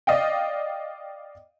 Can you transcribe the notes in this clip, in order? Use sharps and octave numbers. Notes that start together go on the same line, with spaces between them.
D5 D#5 F5 G5